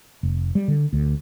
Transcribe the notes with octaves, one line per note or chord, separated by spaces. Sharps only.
F1
G3
D3
D2